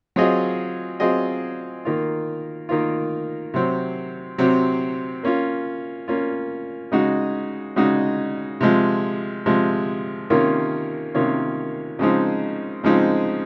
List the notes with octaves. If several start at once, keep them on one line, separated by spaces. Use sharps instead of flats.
F#3 C4 F4 G#4 D#5
F#3 C4 F4 G#4 D#5
D#3 A#3 F4
D#3 A#3 F4
C3 F#3 C4
C3 F#3 C4
A#3 C#4 F4
A#3 C#4 F4
C#3 G#3 D#4 F#4
C#3 G#3 D#4 F#4
C3 F3 G#3
C3 F3 G#3
C3 D#3 A#3 C#4 F4
C3 D#3 A#3 C#4 F4
C#3 F3 G#3 C4 D#4
C#3 F3 G#3 C4 D#4